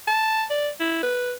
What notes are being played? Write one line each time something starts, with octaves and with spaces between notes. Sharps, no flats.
A5
D5
E4
B4